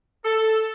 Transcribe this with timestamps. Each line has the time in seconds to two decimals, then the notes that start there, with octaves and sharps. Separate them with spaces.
0.25 A4